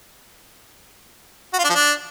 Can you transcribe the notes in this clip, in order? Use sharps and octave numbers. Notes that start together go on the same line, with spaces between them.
F#4
F4
D4
F3
D4